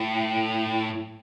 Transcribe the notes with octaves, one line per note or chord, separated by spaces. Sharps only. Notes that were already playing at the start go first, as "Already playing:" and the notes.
Already playing: A2